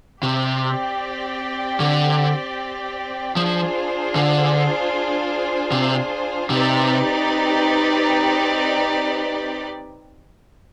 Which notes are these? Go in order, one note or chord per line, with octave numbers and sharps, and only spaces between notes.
C3 C4 G4 D5 G5
D3
F3 D4 F4 G#4 C5
D3
C3
C3 C4 D#4 G4 B4 D5